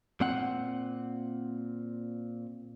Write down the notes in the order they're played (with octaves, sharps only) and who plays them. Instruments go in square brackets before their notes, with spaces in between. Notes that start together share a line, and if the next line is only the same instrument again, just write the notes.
[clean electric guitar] A#2 C4 F#5